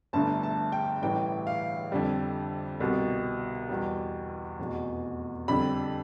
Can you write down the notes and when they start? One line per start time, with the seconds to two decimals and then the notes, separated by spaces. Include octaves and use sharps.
0.13 G1 G2 D3 A3 A5
0.43 A5
0.72 G5
1.02 A1 A2 E3 G3 G5
1.47 F5
1.92 F2 D3 G3
2.80 C2 B2 G3
3.69 E2 B2 G3
4.59 F1 E2 B2
5.48 F2 D3 G3 B5